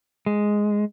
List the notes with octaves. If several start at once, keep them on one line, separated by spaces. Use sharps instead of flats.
G#3